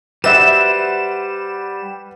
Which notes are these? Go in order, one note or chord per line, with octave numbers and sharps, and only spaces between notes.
G3 F#4 B4 C5 E5 F#5 E7